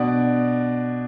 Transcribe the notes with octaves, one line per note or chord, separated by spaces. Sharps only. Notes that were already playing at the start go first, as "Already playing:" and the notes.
Already playing: B2 B3 D4 D5